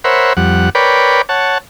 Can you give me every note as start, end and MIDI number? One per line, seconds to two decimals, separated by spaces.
0.04 0.33 70
0.04 0.33 72
0.04 0.33 73
0.04 0.33 76
0.04 0.33 78
0.04 0.33 83
0.37 0.70 41
0.37 0.70 55
0.37 0.70 78
0.75 1.22 70
0.75 1.22 71
0.75 1.22 73
0.75 1.22 74
0.75 1.22 79
0.75 1.22 83
1.29 1.58 73
1.29 1.58 78
1.29 1.58 81